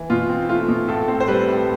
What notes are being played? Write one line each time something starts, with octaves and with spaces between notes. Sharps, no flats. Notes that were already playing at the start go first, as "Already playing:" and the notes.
Already playing: E3
B2 F4
C4
A3 F4
B2
A2 A4
C4
C5
G3 B4
A2